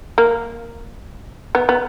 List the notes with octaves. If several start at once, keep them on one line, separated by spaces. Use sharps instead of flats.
A#3
B3
B3